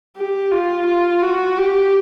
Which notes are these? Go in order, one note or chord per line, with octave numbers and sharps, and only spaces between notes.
G4
F4
F4
F#4
G4